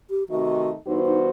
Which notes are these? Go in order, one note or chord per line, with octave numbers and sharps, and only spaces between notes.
G4
C3 D#3 A3 D#4 F#4
G2 E3 B3 D#4 F#4 C5
D#4